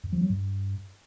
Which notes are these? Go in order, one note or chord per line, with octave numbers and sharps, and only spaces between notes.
F2
F3
F#3
G2